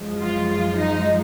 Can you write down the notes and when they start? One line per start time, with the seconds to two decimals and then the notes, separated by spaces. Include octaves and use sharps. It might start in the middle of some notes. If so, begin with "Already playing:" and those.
Already playing: F#2 F3 G#3
0.21 F4
0.49 F4
0.78 D#4